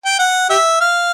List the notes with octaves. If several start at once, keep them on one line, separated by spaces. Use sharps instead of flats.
G5
F#5
G4 E5
F5